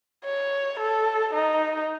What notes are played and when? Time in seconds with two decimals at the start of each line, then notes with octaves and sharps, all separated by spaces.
0.25 C#5
0.79 A4
1.33 D#4